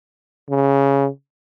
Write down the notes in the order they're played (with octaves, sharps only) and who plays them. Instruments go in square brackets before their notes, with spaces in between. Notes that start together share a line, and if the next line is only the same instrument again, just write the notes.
[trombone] C#3